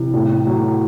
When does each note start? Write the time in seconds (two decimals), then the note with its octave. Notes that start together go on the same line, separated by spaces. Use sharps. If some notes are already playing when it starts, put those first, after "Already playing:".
Already playing: C3 E3
0.14 A2
0.47 F#3